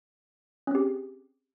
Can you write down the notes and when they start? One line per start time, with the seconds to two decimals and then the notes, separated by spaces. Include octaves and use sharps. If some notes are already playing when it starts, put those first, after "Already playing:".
0.67 C#4
0.71 C4
0.75 G4
0.79 G#4